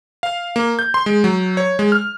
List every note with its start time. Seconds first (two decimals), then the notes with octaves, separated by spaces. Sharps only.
0.23 F5
0.56 A#3
0.79 G6
0.94 C6
1.06 G#3
1.24 F#3
1.57 C#5
1.79 G#3
1.92 F6